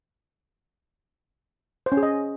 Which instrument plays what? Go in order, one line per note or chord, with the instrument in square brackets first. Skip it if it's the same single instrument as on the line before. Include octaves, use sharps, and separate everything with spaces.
[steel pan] C5
C#4
G#4
D#5